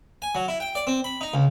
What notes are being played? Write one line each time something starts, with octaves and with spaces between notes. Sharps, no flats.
G#5
F#3
E4
G5
D5
C4
B5
D#4
C#2